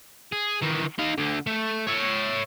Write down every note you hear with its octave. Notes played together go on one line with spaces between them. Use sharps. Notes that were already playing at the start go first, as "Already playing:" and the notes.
G#4
D#3 E3
D#4 F5
D2 D3
A3
C#5 E5